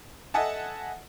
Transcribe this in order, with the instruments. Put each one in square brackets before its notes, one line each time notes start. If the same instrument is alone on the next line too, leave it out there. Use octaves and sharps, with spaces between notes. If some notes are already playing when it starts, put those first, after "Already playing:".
[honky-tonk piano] A4 D#5 E5 F#5 G#5 A5